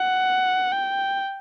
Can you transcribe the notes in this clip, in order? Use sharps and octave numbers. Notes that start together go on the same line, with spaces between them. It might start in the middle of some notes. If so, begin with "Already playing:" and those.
Already playing: F#5
G5